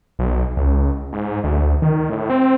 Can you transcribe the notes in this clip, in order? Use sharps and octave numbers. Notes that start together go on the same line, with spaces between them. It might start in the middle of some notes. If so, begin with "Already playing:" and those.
B1
C#2
G#2
D2
D#3
A2
C4